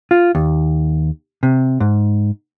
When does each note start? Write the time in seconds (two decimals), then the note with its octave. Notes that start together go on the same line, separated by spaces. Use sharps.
0.11 F4
0.35 D#2
1.43 C3
1.80 G#2